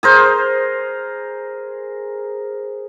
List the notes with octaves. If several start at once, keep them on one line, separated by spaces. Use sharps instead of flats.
G#4 A#4 C5